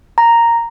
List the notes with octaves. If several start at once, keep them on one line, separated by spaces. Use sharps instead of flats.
A#5